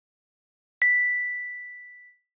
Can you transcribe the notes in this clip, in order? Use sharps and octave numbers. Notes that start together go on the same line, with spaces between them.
B6